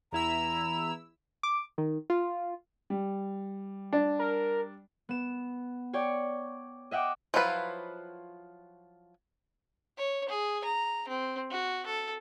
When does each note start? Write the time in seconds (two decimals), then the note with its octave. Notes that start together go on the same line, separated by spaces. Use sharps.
0.12 E2 E4 A#5 E6
1.43 D6
1.78 D#3
2.10 F4
2.90 G3
3.93 D4
4.19 A#4
5.09 B3 E7
5.93 C#5 D5 G5 C#6
6.91 D#5 E5 F#5 G5 D6
7.34 F3 F#3 E4 F4 B4
9.98 C#5
10.29 G#4
10.65 A#5
11.08 C4
11.51 F#4
11.86 A4